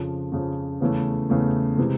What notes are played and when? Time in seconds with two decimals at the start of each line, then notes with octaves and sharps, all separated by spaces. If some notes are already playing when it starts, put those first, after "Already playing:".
Already playing: F2 C#3 F3
0.32 F2 C#3 F3
0.80 E2 C#3 E3 A3
1.30 E2 C#3 E3 A3
1.78 C3 E3 G#3